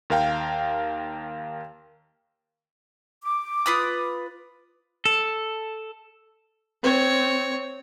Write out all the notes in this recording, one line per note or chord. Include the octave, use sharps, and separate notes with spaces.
D#2 A#4 F5 G5
D6
F4 B4 D#6
A4
C4 C#5